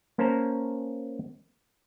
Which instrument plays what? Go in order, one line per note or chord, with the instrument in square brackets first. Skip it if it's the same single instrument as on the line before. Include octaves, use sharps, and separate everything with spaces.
[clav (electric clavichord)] A#3 C#4 A#4 C5 A5 A#5